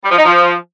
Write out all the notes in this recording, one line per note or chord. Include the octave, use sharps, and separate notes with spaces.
G3
F3
D#4
F3